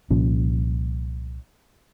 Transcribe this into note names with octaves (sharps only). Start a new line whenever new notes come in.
C2 A#2 F3 C#4